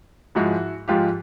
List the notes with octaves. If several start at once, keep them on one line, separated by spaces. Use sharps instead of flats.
G#2 F3 G#3 E4 F#4
G#2 F3 G#3 F4 G4